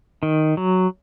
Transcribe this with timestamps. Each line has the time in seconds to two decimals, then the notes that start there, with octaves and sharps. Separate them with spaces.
0.23 D#3
0.57 F#3